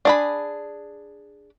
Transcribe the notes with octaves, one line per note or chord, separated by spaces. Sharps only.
D4 G#4 B5